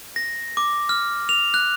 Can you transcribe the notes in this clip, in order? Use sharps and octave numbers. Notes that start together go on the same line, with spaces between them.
A#6
D6
F6
F7
F#6